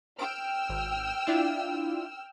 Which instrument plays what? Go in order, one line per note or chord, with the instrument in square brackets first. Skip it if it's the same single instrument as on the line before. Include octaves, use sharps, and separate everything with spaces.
[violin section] G5 E6 F6 [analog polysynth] D7
[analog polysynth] G#1
D4 E4 F4